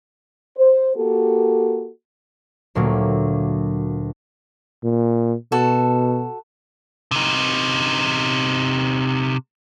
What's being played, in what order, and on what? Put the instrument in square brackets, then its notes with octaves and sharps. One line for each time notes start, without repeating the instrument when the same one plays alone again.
[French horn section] C5
A#3 F#4 G4 A4
[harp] D2 A#2 F#3 A#3
[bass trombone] A#2
[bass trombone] B2 [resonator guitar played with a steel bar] F#4 A4
[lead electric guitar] C3 D#4